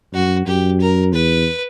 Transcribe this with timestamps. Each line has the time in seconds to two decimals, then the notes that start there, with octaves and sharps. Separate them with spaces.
0.13 F#2 F#4
0.47 F#2 G4
0.80 A#4
1.13 E2 B4